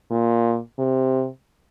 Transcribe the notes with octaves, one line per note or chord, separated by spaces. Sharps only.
A#2
C3